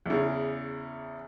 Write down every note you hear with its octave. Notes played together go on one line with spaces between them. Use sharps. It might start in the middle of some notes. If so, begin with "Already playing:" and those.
E2 C#3